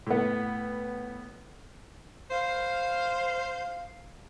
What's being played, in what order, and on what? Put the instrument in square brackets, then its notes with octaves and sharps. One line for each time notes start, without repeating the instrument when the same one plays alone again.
[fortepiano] A2 B3
[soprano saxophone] C5 [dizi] F5